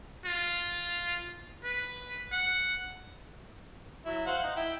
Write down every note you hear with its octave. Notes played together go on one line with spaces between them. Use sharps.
F4
B4
F#5
F#3 E4
C5 F5 F#5
D#4
E4 G5